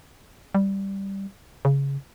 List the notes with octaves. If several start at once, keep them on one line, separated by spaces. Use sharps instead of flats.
G3
C#3